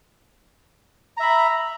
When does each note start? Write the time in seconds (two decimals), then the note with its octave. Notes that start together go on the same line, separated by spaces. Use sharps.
1.17 A#5
1.20 E5
1.22 B5